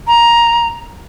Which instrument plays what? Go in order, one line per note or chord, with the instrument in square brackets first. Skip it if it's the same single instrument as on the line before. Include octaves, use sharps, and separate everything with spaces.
[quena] A#5